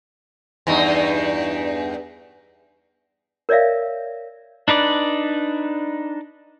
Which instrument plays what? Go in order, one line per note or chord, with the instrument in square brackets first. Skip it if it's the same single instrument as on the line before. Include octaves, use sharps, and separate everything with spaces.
[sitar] E2 G2 D#4
[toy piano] A#4 C#5 D5 E5 F5
[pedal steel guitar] D4 D#4 B4 D5